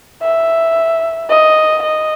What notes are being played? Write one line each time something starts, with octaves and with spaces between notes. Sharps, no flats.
E5
D#5
D#5